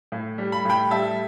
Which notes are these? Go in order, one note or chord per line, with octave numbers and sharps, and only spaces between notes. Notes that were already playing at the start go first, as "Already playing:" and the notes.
A2
G3
B5
A2 G5 B5
G3 E5 A5